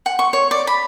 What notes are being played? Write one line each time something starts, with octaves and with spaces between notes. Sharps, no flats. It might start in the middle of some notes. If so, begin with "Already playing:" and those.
F#5
C#6
C#5
D5
B5